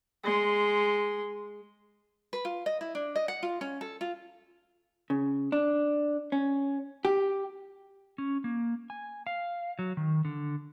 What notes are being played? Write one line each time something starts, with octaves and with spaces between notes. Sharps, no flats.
G#3 C6
B4
F4
D#5
E4
D4
D#5
F#5
F4
C#4
A4
F4
C#3
D4
C#4
G4
C#4
A#3
G#5
F5
F#3
D#3
D3